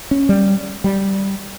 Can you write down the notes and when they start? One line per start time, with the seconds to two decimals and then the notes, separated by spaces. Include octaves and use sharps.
0.11 C#4
0.29 G3
0.84 G3